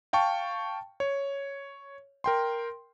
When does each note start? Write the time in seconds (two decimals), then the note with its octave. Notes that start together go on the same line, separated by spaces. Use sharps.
0.13 F5 G5 A5 C#6
1.00 C#5
2.24 A#4 G5 C6